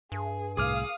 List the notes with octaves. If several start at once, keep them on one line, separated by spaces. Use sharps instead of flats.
G2 G#4
C2 A2 G#4 F5 D6 D#6 F6